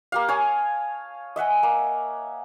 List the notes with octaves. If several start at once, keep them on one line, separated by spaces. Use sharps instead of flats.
A#3 G4 F5
C#5 G#5 A5 D#6
D#5 E5 F#5 G#5
A#3